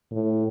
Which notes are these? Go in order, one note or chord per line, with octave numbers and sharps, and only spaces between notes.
A2